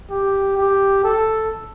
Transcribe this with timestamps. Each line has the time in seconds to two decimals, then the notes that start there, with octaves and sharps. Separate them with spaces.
0.10 G4
0.57 G4
1.04 A4